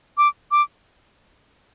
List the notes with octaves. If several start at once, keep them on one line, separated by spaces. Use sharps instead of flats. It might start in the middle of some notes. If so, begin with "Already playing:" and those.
D6
D6